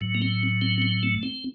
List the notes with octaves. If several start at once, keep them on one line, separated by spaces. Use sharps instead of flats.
A2 F#3
A#3
C4
C4
C4
A3
C4